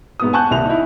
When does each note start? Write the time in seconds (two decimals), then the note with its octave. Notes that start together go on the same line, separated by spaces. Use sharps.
0.20 G#2 B3 D#6
0.33 F#5 G#5 A5 C#6 F#6 G6
0.50 D#1 C2 F7
0.66 D#4 E4